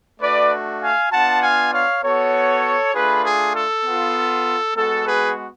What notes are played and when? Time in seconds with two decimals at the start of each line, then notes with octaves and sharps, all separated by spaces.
0.21 A3 D4 F#4 B4 D5
0.81 F5 G#5
1.11 B3 D4 F4 F#5 A5
1.42 F5 G#5
1.72 C#5 F5
2.03 B3 F#4 A4 C#5
2.93 A3 D4 F4 G#4 B4
3.24 G#4
3.54 A4
3.84 B3 F4
4.76 G#3 B3 F#4 A4
5.05 G#4 B4